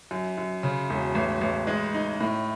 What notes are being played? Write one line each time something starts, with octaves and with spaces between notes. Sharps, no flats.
F#2
F#2
C#3
E1
A1
A1
G#3
D#4
A2